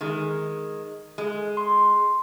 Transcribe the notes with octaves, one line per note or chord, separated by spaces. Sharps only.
D#3 G#3
G#3
C6